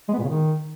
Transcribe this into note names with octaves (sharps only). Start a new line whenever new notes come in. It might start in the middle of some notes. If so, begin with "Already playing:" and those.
G#3
B3
A#2
C#3
D#3